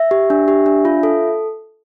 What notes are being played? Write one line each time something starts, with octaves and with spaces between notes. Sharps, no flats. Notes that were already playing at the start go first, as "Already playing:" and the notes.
Already playing: E5
G4
D4
G4
D4
F4
A4